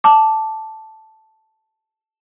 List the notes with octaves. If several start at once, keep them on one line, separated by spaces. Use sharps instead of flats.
A5 D6